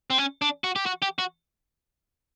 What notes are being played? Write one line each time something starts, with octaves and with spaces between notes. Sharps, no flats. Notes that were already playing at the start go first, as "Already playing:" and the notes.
C4
C#4
D4
F#4
G4
F#4
G4
F#4